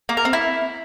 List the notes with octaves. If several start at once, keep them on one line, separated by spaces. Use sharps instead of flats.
A#3
A#4
C4
E4